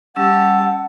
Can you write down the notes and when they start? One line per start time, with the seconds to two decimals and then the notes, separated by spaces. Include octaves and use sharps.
0.16 G3 C#4 G4 F#5 A5 E6